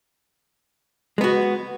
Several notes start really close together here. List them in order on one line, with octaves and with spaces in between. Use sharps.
G#3 B3 F#4